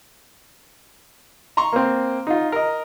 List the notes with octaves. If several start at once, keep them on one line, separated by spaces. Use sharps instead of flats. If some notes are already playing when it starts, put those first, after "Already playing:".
A#5 C6 C#6
A#3 C4
D#4 F4
A#4 D#5